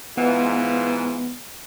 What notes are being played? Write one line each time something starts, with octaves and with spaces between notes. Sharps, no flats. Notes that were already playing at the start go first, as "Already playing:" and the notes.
G#2 E3 B3 F4